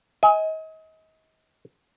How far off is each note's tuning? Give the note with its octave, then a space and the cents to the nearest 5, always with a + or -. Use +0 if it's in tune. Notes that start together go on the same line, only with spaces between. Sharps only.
D#5 +35 G#5 +0